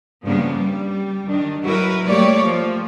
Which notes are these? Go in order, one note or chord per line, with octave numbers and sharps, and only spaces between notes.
G2 C#3 F3 A#3 B3 D4
G3
D#3 D4
F#3 E4 F#4 A#4 B4
G3 A3 A#3 G4 C#5 D5
F3